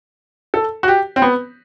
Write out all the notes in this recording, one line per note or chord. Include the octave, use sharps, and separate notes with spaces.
A4
F#4
G4
C4
B3